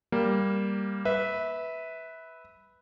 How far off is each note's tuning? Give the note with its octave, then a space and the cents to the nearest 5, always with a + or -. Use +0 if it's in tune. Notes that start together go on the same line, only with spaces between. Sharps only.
G3 +5 A#3 +0
B4 +0 E5 -20